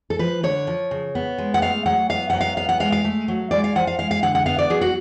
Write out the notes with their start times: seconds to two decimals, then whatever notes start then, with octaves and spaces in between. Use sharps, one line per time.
0.10 A4
0.19 F3 B4
0.43 D3 C#5
0.67 F3
0.91 C#3
1.15 B3
1.38 G#3
1.54 F#5
1.62 A3 F5
1.86 F#3 F#5
2.09 B3 F5
2.30 F#3 F#5
2.41 F5
2.57 B3 F5
2.69 F#5
2.80 G#3 F5
2.92 F5
3.04 A3
3.28 F#3
3.51 G#3 D5
3.64 F5
3.75 F3 F#5
3.87 F5
3.99 G#3 F5
4.11 F5
4.22 D3 F#5
4.35 F#5
4.46 B3 F5
4.58 D5
4.70 F#3 G#4
4.81 F#4